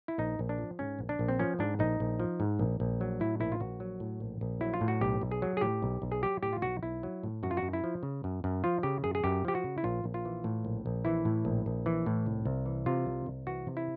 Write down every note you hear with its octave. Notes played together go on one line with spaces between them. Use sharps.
E4
A#1 D#4
A#1
D4
F3
G#2 C#4
A#1
D4
A#1
C4
F3 C#4
G#2 D4
A#1 D#4
A#1
F3
G#2
A#1
A#1
F#3
A2 E4
A#1 E4
F4
A#1 F#4
F#3
A2
A#1
A#1
F#3 E4
F4
A2
F#4
B1 G4
B1
G#4
F#3
G#4
A2 G4
B1
B1
G#4
F#3 G4
A2 G4
F4
B1 F#4
B1 E4
F#3
A2
F#2 F#4
F4
F#4
F#2
E4
F3
C#3
F#2
F#2
F3 F4
C#3 G4
F#2 G#4
G#4
F#2 G4
F3 G4
F#4
C#3
E4
A#1 F4
A#1
F4
E3
A2
A#1
A#1
E3 E4
A2
A#1
A#1
E3
A2
C2
C2
E3
C3 F4
C2
C2
E3 F#4
C3
E4